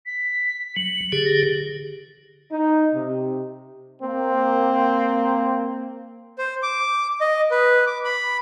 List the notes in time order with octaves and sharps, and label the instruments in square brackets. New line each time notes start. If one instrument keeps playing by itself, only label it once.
[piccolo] B6
[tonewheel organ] F#3 [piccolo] F#7
[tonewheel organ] D3 G4 G#4
[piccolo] A#6
[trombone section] D#4
C3
A#3 C4
[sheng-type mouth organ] C5
D6
D#5
B4
D6
B5